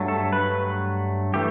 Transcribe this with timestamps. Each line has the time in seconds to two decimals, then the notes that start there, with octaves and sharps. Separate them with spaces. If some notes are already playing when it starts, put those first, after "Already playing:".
Already playing: G2 F#3 A3
0.08 A4
0.33 B4
1.34 E3 A3 G4